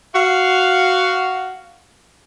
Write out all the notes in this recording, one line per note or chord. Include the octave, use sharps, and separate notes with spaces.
F#4 F5